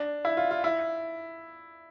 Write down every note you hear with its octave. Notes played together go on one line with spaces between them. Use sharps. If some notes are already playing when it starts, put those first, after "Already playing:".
Already playing: D4
E4
F4
F4
E4